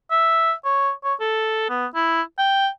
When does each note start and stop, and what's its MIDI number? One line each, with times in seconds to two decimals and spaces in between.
0.11 0.53 76
0.65 0.91 73
1.04 1.14 73
1.20 1.68 69
1.69 1.86 59
1.95 2.22 64
2.38 2.68 79